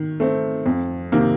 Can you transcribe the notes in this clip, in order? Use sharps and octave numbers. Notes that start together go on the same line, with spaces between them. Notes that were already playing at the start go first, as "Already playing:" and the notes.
Already playing: D#3
A3 C4
F2
C3 D#3 A#3